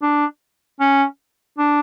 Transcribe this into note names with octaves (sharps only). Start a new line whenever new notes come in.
D4
C#4
D4